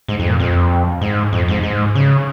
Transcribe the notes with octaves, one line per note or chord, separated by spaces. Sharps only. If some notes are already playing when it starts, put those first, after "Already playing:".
G#2
F2
A#2
F2
G#2
F2
G#2
G#2
C#3